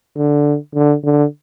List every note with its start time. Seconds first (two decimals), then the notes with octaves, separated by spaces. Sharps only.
0.16 D3
0.75 D3
1.04 D3